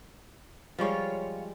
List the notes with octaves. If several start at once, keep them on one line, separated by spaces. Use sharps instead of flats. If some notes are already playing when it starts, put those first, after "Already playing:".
F3 G3 G#3 F4 C#5